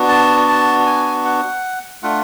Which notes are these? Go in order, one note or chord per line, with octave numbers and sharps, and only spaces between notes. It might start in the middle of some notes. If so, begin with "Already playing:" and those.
Already playing: B3 D4 F#4
A5
A5
G#5
F#5
A3 D4 F4 F#5